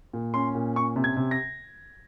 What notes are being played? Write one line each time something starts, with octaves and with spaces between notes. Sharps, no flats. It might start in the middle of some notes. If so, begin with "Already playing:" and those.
A#2
C#4 C6
A#2
C#4 C#6
C3
G#6
C3
A#6